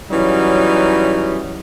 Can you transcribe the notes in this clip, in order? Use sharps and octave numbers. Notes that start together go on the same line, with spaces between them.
E3 F#3 G3 C#4 D#4